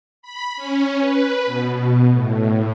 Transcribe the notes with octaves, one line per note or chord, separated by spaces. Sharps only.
B5
C#4
B4
B2
A2